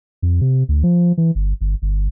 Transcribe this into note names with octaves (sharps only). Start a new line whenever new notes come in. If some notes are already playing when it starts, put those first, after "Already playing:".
F2
C3
D2
F3
E3
G1
G1
G1